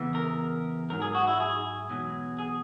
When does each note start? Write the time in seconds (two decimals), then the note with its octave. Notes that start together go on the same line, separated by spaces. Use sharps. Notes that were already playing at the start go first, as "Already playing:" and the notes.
Already playing: E2 C#3 E3
0.15 A#4
0.90 G#2 F#3 A#4
1.02 G#4
1.15 F#4
1.27 E4
1.40 G#4
1.89 E2 B2 F#3
2.39 G#4